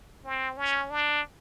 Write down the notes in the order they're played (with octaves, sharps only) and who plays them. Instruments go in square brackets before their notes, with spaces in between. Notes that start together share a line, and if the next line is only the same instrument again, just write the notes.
[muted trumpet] C4
C#4
D4